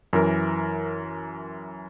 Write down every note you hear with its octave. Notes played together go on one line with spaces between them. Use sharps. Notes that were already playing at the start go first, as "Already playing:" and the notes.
F#2 E3 A#4